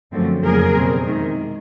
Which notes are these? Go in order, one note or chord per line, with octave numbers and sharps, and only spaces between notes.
F#2 D3 F3 A3 C4
F2 C#3 F#3 A#3 G#4 A#4
E2 B2 G3 C4
C3 D#3 G#3